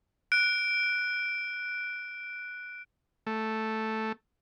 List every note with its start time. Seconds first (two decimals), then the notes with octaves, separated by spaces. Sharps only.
0.32 F#6 D7
3.27 A3